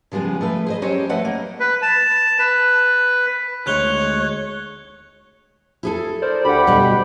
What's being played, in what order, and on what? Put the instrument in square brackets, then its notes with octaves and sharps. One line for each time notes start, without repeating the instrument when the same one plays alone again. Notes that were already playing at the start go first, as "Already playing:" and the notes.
[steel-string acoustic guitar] C#3 F3 G3 G#3 B3
F3 A3 B4
G#4 C5 D#5
F#3 G#3 C#4 G4 C5 C#5
F3 A3 B4 D#5 F#5
A#3
[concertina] B4
A5
B4
[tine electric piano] D2 G#3 [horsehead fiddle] C#5 [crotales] F#6 F7 G7
[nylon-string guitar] E4 G#4 A4
[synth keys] A#4 C5 D5
[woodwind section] D2 G4 [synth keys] F#5 B5
[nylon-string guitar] B2 G3